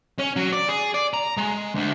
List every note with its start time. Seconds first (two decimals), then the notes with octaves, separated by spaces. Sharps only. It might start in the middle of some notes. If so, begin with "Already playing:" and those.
0.19 C#4
0.36 F#3
0.53 D5
0.69 G#4
0.94 D5
1.14 A#5
1.37 G#3
1.75 D2